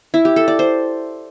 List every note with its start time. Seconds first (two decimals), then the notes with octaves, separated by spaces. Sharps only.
0.14 E4
0.25 G4
0.36 A4
0.48 D5
0.59 C5